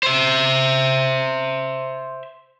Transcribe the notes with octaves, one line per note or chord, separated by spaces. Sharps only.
C5 E5